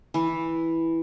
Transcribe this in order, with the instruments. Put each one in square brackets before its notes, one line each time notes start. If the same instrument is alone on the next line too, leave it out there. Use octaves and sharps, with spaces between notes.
[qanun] E3